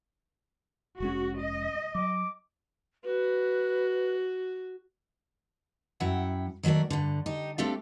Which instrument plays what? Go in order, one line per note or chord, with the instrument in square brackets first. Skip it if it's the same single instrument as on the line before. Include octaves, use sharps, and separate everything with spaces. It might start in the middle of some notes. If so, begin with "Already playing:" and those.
[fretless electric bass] F1 G#3 C#4 [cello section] F#4
[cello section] D#5
[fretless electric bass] F#3 [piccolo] D6
[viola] F#4 [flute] B4
[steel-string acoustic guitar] F#2 E4 F#5 G5
D#3 F#3 A3 A#4 D5
G2 D3
D#4 G4
A3 C4 D4 G4 A4 F5